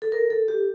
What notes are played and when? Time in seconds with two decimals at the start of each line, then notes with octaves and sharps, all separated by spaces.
0.02 A4
0.12 A#4
0.30 A4
0.48 G4